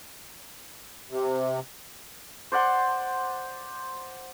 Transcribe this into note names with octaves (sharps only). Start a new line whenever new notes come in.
C3
C5 D5 F#5 C6